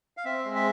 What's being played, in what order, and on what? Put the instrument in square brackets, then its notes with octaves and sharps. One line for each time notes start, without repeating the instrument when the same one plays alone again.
[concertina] F5
C4 E5
G#3
E5